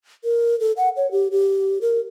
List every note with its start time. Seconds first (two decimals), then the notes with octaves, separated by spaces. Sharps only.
0.24 A#4
0.60 A4
0.77 F#5
0.97 C#5
1.12 G4
1.32 G4
1.81 A#4